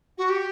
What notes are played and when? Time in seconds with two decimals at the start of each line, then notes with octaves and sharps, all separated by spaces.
0.17 F#4
0.29 G4